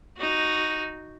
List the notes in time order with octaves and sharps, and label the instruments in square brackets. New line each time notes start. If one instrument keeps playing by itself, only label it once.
[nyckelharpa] D#4 F#4